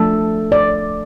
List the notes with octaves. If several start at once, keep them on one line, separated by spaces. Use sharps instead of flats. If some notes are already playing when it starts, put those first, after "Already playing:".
Already playing: F3 A3 D4 A4
D5